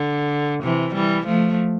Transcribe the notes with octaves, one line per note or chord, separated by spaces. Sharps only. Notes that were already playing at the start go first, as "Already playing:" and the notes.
Already playing: D3
C3 E3
E3 G3
F3 A3